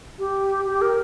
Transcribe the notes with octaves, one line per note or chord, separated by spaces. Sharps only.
G4
G4
A#4